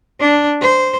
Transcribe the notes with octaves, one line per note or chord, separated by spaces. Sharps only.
D4
C5